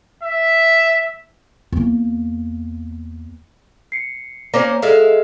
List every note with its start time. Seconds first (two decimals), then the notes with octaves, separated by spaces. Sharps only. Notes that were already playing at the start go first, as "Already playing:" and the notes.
0.23 E5
1.73 E2 A#3
3.92 C7 C#7
4.54 A#3 C#4 C5 A#5 D6
4.82 G#3 A4 E5 F5